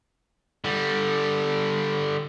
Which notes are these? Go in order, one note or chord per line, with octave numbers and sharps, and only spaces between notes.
D3 G3